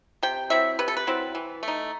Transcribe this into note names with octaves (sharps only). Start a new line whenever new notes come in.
C3 G5
F#3 C4 E4 E5
C3 B4
A4
B4
F#3 C4 E4
E3
A3
D#4